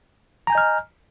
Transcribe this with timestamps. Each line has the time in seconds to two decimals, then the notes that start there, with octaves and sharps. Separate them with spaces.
0.47 A#5
0.50 G#5
0.52 G6
0.55 D#5
0.58 F6